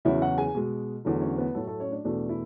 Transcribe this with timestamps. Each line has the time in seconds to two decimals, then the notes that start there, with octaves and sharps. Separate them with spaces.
0.05 E2 C#3 F#3 E4 E5
0.22 F#4 F#5
0.38 G#4 G#5
0.55 B2 G#3
1.05 E2 D3 F#3 A3
1.21 C#4 C#5
1.38 B3 B4
1.55 A2 F#3 A3 A4
1.67 A3 A4
1.80 C#4 C#5
1.92 D4
2.04 E2 B2 A3 D4
2.29 E4